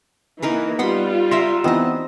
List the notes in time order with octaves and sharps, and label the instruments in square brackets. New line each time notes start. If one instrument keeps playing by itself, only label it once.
[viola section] E3 A#3 [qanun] D#4 A#4 B4
[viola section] G3 F4 [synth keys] B3 [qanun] F#5 B5 C6
[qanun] A#4 E5 F#5 [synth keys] C6
[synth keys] E3 B3 D#4 [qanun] C4 D#5